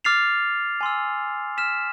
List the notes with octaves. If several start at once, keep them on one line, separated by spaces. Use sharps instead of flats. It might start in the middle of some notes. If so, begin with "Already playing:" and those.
D6 F6 A6 C7 F7
G#5 C6 E6
F6 B6 E7